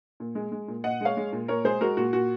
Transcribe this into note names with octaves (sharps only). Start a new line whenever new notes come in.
A#2
G#3
G#3
A#2
A#2 D#5 F#5
G#3 C#5 F5
G#3
A#2
A#2 A#4 C#5
G#3 G#4 C5
G#3 F#4 A#4
A#2 F#4
A#2 F#4